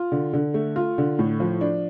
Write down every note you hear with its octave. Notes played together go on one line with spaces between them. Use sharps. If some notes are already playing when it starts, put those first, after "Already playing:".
Already playing: F4
D3
D3
A3
F4
D3
A2
F3
D4